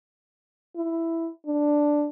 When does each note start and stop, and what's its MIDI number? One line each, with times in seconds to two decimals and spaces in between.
0.76 1.30 64
1.46 2.10 62